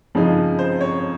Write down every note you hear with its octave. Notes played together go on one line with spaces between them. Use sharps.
F2 C#3 F3 G#3 D#4
C5
C#5